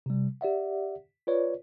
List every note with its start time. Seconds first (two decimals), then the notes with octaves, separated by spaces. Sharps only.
0.06 C3 G3
0.41 G4 D5 E5 F#5
1.27 F4 B4 C#5 D5